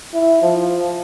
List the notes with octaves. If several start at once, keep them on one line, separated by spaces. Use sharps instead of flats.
E4
F3